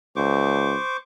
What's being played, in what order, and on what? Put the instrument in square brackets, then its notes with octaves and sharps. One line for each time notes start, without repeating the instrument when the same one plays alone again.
[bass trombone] C#2 [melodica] C5 C#6 D6